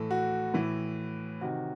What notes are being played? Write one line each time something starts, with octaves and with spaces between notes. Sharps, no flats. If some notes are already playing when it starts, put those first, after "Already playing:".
Already playing: A2 E3 A4
F#4
A2 E3
C3 D#3 F#4